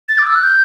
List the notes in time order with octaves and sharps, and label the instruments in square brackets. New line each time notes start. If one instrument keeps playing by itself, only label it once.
[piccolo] A6
D6
E6
F#6
G6